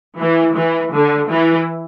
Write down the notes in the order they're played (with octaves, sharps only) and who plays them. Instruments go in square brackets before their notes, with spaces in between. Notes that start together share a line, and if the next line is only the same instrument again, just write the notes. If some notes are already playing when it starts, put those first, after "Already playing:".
[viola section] E3
E3
D3
E3